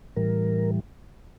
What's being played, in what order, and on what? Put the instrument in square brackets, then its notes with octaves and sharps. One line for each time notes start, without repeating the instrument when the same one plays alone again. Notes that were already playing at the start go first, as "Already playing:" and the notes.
[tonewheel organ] A2 E3 G3 A#4